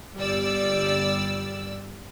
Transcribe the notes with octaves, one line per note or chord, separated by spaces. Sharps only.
G1 G3 D5 E6